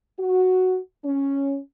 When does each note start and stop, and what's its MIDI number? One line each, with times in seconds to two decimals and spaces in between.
0.19 0.78 66
1.04 1.59 61